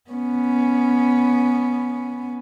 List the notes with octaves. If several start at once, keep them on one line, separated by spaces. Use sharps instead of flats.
B3 C#4